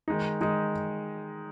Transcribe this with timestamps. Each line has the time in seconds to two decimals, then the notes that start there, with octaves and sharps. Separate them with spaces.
0.08 D#3 G#3 D#4
0.41 D#3 G#3 D#4